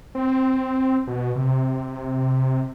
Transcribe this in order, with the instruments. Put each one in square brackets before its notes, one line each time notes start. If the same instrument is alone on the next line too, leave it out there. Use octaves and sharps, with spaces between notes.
[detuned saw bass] C4
B2
C3